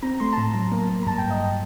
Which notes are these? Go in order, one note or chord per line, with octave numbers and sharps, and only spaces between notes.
C4 A#5
A3 C6
A5
A2 A#5
F#3
A#3
A#3
A#5
G2 A5
G5
G2
D#5